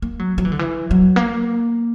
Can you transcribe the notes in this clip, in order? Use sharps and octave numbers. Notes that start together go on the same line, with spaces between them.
A#3
F#3
F#3
E3
D3
E3
F#3
A#3